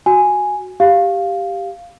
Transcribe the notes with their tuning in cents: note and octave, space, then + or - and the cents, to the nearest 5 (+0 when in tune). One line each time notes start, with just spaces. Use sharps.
F#4 +0 G#5 +0
G4 +0 F5 +0